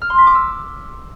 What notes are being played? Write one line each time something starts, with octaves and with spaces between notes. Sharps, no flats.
F6
C6
B6
D6
E6